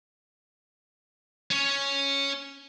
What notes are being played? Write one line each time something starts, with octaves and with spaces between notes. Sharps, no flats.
C#4 C#5